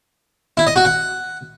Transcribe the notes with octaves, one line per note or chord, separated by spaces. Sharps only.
E4
D#5
F#4
F#5